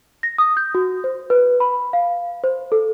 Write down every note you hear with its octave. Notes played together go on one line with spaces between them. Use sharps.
A#6
D#6
G6
F#4
C5
B4
B5
F5
C5
A4